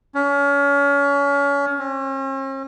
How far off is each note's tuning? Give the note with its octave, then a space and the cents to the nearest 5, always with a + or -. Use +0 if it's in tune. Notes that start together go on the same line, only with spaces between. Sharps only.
C#4 +30
C#4 -45